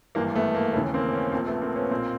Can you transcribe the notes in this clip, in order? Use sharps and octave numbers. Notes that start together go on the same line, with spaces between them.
G#1 G2 E3 A#3
A3 B3
A#3
D#2 C#3 E3 A3 B3
A#3 C4
B3 C#4
A#1 A#2 A#3 C4
A3 B3
A#3 C4
B3 C#4
B1 A#2 A#3 C4